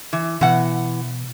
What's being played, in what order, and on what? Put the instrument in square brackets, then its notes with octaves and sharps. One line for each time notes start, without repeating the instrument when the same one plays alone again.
[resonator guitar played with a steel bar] E3
[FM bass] B2 [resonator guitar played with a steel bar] E3 F#5